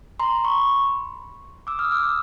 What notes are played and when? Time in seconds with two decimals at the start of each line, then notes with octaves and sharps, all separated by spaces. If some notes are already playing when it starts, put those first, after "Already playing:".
0.20 A#5 C6
0.44 B5 C#6
1.67 D6 E6
1.79 D#6 F6
1.92 D6 E6
2.03 D6 E6